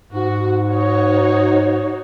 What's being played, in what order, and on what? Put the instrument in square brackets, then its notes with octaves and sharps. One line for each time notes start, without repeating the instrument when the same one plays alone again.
[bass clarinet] G#2 [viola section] F#4
[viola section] D#4 F#4 C#5